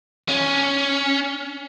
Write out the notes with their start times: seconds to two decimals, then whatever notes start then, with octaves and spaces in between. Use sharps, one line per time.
0.29 C#4